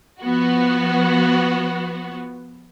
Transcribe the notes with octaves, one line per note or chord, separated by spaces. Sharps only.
F3 B3 F#4